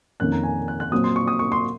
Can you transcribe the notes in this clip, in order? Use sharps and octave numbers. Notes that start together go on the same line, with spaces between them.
F2 D#3 A#3 C#4 F#6
A#5
G#5
F#6
F#6
A#2 F#3 C4 D#6
C6
C#6
D#6
C#6
C6